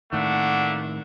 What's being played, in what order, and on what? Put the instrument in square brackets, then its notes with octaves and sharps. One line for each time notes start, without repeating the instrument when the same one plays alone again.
[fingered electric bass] A2 D#3 [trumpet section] A3 A#3 D4 [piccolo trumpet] F#5